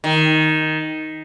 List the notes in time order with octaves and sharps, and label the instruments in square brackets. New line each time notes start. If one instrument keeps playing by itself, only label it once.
[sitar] D#3